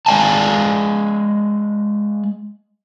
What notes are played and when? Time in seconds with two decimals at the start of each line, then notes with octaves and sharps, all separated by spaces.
0.06 G#3 D5 F5 G#5 A5